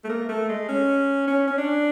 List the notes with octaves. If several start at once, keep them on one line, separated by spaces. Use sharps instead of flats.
A3
A#3
A3
G#3
C#4
C#4
C#4
D4